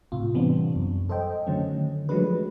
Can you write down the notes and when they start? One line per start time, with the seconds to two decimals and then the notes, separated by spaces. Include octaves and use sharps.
0.12 A2 C3 F4
0.34 C3 E3 G3 B3 C4 D4
0.76 F#2
1.09 A4 C5 D#5 G5
1.47 D3 D#3 F#3 A3 C#4
2.09 F3 F#3 G#3 A3 D4 B4